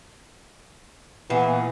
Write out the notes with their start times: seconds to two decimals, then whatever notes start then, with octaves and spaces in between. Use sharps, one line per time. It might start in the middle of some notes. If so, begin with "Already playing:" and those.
1.30 A#2 E3 B3 G#4